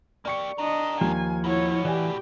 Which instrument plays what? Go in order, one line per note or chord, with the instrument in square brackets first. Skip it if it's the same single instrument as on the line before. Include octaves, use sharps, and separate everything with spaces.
[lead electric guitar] A#3 G4 [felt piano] D5 C#6 C#7
[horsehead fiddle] D4 D#5 [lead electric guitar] G4 A#4
[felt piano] D#2 A#3 [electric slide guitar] F3 [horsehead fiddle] G#5
[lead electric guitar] A2 F#4 [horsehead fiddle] E4 C#5
[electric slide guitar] E3 [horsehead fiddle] G4 [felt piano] D5 G#5